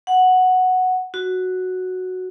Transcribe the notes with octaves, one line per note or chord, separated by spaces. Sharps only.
F#5
F#4